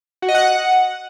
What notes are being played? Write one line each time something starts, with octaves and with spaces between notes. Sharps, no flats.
F#4
D#5
F#5